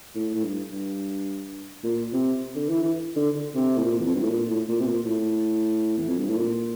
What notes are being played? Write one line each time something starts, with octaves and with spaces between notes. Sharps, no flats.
A2
A2
G2
G2
A#2
C3
D3
E3
E3
D3
D3
C3
A2
A#2
E2
F2
G2
A2
A#2
A2
A#2
C3
A#2
A2
E2
F2
G2
A2
A#2